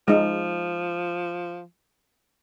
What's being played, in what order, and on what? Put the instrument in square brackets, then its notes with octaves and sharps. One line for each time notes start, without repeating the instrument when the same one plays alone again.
[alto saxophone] F3 [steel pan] G#3 D#4